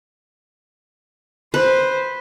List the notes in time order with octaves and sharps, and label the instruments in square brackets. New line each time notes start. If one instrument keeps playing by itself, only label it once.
[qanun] B4 [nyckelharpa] C5